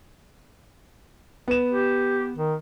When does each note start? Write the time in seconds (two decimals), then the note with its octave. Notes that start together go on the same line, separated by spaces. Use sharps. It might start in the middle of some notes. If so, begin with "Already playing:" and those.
1.48 B3 E7
1.72 G4
2.36 D#3